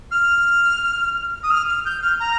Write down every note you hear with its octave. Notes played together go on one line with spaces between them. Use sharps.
F6
D#6
F6
F6
G6
F6
A#5